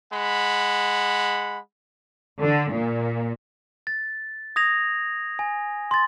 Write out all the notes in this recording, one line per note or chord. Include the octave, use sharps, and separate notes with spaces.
G#3 F#5 B5
D3
A#2
A6
D#6 G#6 A#6 F7
G#5
C6 A6